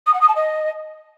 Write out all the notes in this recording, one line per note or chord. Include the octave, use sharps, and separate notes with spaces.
D#6
F#5
D#6
A5
D#5